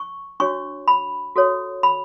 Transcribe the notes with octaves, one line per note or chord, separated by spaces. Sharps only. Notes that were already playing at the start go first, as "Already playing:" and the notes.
Already playing: C#6
D4 F#4 C#5 C#6
B5
F#4 A4 C#5
B5